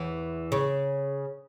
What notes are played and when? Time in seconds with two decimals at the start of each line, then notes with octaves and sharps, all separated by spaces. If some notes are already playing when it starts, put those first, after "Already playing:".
Already playing: E2 E3
0.52 C#3